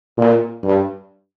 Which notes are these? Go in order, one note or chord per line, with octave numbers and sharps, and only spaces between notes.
A#2
G2